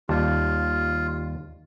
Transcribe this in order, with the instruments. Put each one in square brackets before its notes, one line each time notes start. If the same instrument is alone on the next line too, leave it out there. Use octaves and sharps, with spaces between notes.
[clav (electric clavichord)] D#2 G3 A5 [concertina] F4